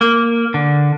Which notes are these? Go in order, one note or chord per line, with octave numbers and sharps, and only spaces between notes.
A#3
D3